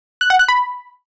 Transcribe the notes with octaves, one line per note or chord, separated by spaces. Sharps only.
F#6
F#5
F#6
B5